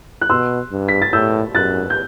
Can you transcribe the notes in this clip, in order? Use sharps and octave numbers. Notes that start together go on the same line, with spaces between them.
F#6
B2 C6 E6
G2
B6
A6
A2 E6 G6
F#2 F#6 A6
G6